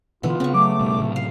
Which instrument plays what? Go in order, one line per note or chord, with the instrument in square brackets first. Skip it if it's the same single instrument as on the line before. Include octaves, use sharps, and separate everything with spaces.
[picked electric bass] B2 D3 E3 [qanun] B3 [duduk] F4
[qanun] C#3 C#6 [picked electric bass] B3 C4
[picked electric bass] F#3 [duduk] A3 [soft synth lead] D6
[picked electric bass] G2 B2 G3
A2 C3 F#3
[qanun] F5